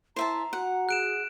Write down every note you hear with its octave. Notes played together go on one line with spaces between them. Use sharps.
E4 C5 E5 A5 A#5
F#4 F#5
G#4 F#6 D7 E7